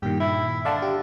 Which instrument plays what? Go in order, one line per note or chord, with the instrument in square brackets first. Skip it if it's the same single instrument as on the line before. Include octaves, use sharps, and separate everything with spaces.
[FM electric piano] G2 A#2 D#3 [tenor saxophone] G4
[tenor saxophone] E4
[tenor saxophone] D3 [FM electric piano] F5 A5
[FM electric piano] G4